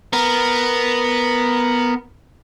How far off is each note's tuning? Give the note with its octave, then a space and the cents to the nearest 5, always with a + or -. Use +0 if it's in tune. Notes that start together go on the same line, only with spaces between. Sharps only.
B3 +0 A#4 +0